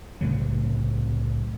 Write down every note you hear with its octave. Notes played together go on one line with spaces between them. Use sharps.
C2 A2 C#3 F#3